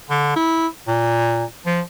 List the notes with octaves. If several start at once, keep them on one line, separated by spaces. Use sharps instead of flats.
D3
E4
A#2
F3